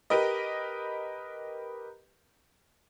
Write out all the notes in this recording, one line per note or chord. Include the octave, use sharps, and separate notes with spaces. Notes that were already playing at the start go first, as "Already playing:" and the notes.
G4 A#4 B4 D#5